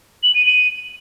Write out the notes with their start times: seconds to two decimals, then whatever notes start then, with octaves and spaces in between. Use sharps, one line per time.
0.23 F#7
0.35 D#7
0.46 D#7